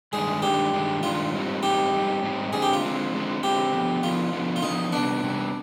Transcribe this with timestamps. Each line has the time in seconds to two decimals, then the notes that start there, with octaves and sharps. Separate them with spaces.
0.13 G2 D#3 G#3 D4 G#4
0.42 G2 D#3 G#3 D4 G4
0.73 G2 D#3 G#3 D4
1.03 G2 D#3 G#3 D4 F4
1.32 G#2 G3 C4 D#4
1.63 G#2 G3 C4 D#4 G4
1.93 G#2 G3 C4 D#4
2.22 G#2 G3 C4 D#4
2.53 D3 G#3 C4 G#4
2.62 G4
2.73 F4
2.82 D3 G#3 C4
3.12 D3 G#3 C4
3.43 D3 G#3 C4 G4
3.72 D3 F3 B3
4.03 D3 F3 B3 F4
4.33 D3 F3 B3
4.56 F4
4.62 D3 F3 B3 D#4
4.92 C3 G3 B3 D4
5.23 C3 G3 B3